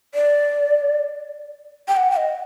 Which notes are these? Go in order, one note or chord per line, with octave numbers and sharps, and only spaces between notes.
D5
G5
F#5
F#5
D#5